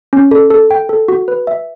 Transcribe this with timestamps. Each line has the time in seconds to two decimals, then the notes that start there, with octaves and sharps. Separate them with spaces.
0.13 C#4
0.31 A4
0.50 A4
0.71 G5
0.89 A4
1.08 F#4
1.28 B4
1.47 E5